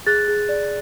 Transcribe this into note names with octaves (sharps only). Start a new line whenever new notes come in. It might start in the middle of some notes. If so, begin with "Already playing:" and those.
G#4 F#6 A6
G#4
D5